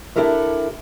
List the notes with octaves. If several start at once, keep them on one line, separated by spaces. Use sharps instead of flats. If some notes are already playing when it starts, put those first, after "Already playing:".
D4 E4 G4 A4 A#4 E5